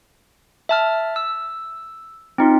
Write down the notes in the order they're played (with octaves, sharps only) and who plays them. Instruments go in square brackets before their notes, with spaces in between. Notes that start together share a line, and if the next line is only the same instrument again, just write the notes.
[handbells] E5 A5 F6
E6
C4 D#4 F4